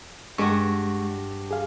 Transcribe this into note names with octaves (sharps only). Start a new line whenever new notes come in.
G2 G#3 F#4 C#6
G#4 F5